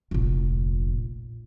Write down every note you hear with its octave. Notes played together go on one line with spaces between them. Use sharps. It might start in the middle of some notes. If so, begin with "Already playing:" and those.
F1 A#1